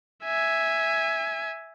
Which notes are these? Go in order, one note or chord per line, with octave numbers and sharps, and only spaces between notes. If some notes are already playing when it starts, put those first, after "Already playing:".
E5 G#5